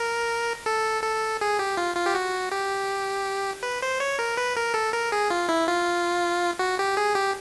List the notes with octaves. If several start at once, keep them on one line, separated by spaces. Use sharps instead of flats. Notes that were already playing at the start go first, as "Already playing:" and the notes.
Already playing: A#4
A4
A4
G#4
G4
F4
F4
G4
F#4
G4
B4
C5
C#5
A#4
B4
A#4
A4
A#4
G#4
F4
E4
F4
F#4
G4
G#4
G4